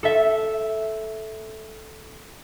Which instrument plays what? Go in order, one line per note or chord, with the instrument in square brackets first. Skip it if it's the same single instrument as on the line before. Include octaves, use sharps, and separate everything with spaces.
[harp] A4 E5